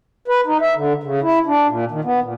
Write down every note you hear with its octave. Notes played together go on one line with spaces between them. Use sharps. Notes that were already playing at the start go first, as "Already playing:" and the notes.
B4
D#4
E5
D3
C#3
E4
D4
A#2
D#3
B3
A#2